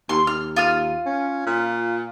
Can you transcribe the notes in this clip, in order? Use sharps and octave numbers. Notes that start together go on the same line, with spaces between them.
D#2 C6
D#2 F6
F4 D#6 F6
C#4
A#2